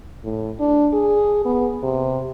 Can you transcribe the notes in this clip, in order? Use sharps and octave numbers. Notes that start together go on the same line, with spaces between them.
A2
D4
G#4
B3
C3